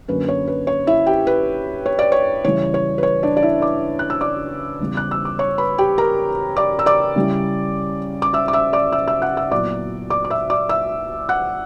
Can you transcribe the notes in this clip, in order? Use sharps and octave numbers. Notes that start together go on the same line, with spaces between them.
F#2 D3 A#3 C#4 B4
C#5
B4
C#5
E4 E5
G4 G5
B4
C#5
D5
C#5
C#3 E3 G3 C#5
C#5
B4
C#5
D4 D5
D5
E4 E5
D5 D6
F#6
E6
D5 D6
E2 C#3 G3
F#6
E6
D6
C#5 C#6
B4 B5
G4 G5
A#4 A#5
D5 D6
E6
D5 D6
C#3 G3 C#4 E4
D6
E5 E6
D6
E5 E6
D5 D6
E5 E6
E5 E6
F#5 F#6
E5 E6
A#2 F#3 B3 E4 D5 D6
D5 D6
D6
E5 E6
D5 D6
E5 E6
F#5 F#6